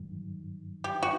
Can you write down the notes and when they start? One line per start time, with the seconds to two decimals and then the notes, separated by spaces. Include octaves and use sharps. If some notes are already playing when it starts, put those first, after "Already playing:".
Already playing: G2 D#3 F#3
0.84 G4
1.03 F#4